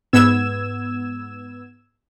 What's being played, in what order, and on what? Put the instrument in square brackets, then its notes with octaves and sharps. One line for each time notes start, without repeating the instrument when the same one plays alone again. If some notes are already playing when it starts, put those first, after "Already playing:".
[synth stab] G#2 B3 E6 G#6 E7